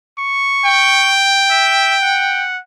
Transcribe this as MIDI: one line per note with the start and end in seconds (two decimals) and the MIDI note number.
0.19 1.14 85
0.65 2.46 79
1.50 1.95 76
2.02 2.59 78